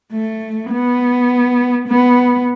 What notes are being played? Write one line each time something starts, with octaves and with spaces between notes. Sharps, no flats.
A3
B3
B3